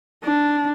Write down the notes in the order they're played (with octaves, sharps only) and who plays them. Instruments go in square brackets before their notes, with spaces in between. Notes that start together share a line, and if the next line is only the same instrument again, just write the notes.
[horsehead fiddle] D4